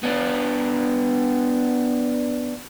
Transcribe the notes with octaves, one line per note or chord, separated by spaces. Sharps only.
B3 D4